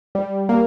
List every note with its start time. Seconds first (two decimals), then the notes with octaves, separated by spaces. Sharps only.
0.15 G3
0.49 A#3